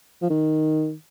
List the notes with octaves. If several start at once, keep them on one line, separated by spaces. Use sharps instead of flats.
F3
D#3